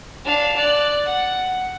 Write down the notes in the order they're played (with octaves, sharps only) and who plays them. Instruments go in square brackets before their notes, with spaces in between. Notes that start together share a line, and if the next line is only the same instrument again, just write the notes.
[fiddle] D4 F5
D5 F#6
F#5